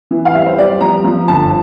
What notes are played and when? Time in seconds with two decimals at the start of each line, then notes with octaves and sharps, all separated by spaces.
0.11 E3
0.25 F5
0.34 G3 E5
0.46 C5
0.58 G3 D5
0.81 F3 A#5
1.05 F3
1.28 G1 A5